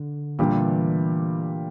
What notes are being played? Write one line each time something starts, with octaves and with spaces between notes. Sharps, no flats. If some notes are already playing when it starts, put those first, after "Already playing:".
Already playing: D3
A#2 E3 G3 D4 G4
A3